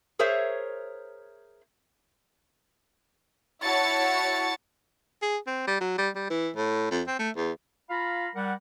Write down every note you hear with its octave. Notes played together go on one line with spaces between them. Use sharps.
G#4 A#4 C5 C#5 E5
E4 F#4 C#5 A5 A6 C#7
G#4
C4
G3
F#3
G3
G3
E3
A2
F2
C4
A3
E2
F4 F5 A#5 B5
G3 A#4 F#5